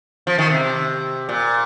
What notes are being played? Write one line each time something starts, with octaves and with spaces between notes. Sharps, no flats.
F3
D#3
C3
A#2